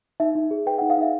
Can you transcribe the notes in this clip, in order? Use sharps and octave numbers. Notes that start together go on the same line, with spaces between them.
D#4 E5
D#4
G#4
B4 G5
D#4 F#5
F5
D#4 E5